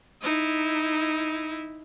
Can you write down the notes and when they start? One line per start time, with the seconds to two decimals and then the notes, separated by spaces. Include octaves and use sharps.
0.22 D#4 E4